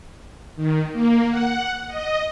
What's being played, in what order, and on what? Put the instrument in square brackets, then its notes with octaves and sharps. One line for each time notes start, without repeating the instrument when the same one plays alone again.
[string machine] D#3
A#3
F#5
D#5